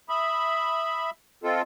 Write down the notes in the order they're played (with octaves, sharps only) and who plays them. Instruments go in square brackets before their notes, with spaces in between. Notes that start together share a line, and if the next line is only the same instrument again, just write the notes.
[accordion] E5 B5 [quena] D#6
[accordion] C4 F4 A4 [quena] D#5